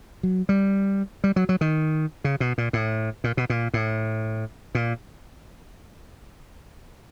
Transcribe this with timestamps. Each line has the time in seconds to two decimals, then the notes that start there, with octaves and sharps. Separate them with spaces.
0.23 F#3
0.49 G3
1.24 G3
1.36 F#3
1.49 F#3
1.61 D#3
2.24 C#3
2.40 B2
2.58 A#2
2.73 A2
3.24 A#2
3.37 B2
3.50 A#2
3.74 A2
4.75 A#2